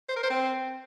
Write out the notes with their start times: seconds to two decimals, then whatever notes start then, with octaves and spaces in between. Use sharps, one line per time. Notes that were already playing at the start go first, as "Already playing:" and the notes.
0.09 C5
0.16 A#4
0.23 C5
0.30 C4